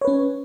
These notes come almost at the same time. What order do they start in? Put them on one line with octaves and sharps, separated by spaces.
C#5 B4 C#4